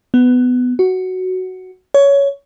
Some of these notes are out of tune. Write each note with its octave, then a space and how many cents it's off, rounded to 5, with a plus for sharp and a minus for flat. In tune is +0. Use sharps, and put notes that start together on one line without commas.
B3 +15
F#4 +5
C#5 +15